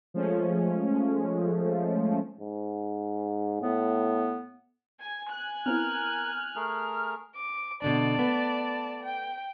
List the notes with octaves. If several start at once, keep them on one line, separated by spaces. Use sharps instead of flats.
F3 G#3 A3 C#4
G#2
A2 B3
G#5
G#5 F#6
B3 C4 E4 A#4 F6
A3 G#4 A#4
D6
B2 D3 D4 D5 A5
A3 B3
G5